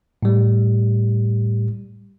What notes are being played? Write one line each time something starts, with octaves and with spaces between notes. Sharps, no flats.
A2 G3